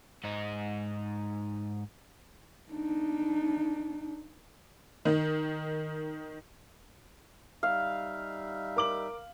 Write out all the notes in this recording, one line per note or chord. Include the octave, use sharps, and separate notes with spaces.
G#2 D#4
D4 D#4
D#3
G3 D#4 E5 F5
A#4 D6 F#7